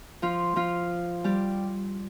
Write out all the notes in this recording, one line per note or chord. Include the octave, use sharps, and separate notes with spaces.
F3 F4
F3 F4
G3 G4